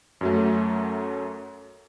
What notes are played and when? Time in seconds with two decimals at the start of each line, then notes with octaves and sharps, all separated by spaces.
0.21 F#2 F#3 A3